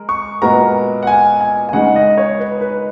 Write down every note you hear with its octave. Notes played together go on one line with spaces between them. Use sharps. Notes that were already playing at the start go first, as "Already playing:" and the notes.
Already playing: G#3 A#4
C#6
A#2 G#3 B3 F#4 A#4 A#5
F#5
G#5
G#5
G#5
C#3 G#3 D#4 F#5
D#5
C#5
B4
B4